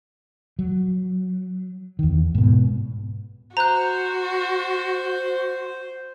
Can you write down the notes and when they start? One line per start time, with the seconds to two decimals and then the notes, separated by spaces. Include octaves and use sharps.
0.59 F#3
1.99 E2 D#3
2.35 G#2 B2
3.57 F#4 C5 A#5 F#6